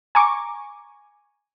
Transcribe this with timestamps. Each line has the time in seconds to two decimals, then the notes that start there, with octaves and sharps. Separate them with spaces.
0.15 G#5 A#5 C#6 D6